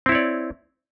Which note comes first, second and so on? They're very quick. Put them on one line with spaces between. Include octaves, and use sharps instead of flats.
C4 E4 C#5 D5